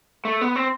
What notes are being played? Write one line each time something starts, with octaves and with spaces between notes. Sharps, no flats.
A3
B3
C4